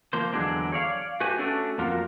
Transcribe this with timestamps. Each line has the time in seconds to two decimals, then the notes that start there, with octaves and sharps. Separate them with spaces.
0.13 F3 A#3 C5
0.33 E2 D3 F#3 G#3 D4
0.72 C#5 D5 F5
1.20 A3 F#4 G4 B4 G#5
1.38 A3 C#4 D4 F#4 A4
1.78 F2 A#3 F4 F#4 A#4